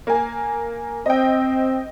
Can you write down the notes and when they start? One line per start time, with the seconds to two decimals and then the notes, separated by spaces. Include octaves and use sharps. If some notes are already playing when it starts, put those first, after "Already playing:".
0.07 A#3 G#5
1.06 C4 D#5 G5